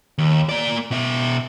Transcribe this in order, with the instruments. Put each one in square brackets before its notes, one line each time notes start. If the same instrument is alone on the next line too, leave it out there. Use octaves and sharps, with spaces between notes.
[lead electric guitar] D#2
A#3 D5
B2 E5